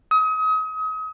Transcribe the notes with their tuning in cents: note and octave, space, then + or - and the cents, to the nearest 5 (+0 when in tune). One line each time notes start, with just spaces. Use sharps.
D#6 +35